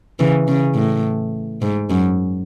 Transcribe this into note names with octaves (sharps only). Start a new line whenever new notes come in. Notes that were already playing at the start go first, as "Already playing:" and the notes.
C#3 E3
C#3
A2
G#2
F#2